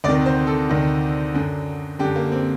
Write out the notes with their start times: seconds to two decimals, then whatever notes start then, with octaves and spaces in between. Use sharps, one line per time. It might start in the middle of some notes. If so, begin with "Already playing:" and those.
0.04 D2 C3 D#3 D5
0.26 C5
0.47 A4
0.69 D2 C3 D#3
1.34 F#2 D3
1.99 D3 G4
2.04 F#2
2.16 A#3
2.32 C4